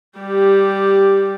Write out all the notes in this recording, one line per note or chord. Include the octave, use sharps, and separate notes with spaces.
G3 G4